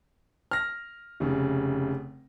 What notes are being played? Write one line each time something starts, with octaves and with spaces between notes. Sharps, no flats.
F6 A#6
F1 C#3